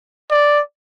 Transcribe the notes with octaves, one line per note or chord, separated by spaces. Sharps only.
D5